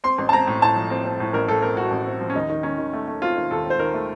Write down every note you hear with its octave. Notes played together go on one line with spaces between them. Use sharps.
C4 C6
A1
A5
C4 A#5
A2
A2 A5
F3
C4
C4
A2
A1 A#4
A2 A4
C4 A#4
A2 F#4
A1
C4
F3
C#4
D#2 D#4
D#3
D#3 C#4
D#3
A3
A3
C4 F4
D#3
D#2 A4
C4
C5
D#3 A#4
A3